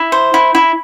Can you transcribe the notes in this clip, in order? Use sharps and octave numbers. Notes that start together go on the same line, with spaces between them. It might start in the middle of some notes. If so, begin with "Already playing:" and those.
Already playing: E4
C5
E4
E4